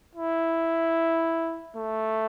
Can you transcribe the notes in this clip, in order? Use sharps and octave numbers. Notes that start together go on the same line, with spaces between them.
E4
A3